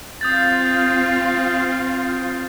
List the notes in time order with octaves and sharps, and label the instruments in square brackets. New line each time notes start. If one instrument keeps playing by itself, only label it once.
[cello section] C4 F4 [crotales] D#6 G6 A6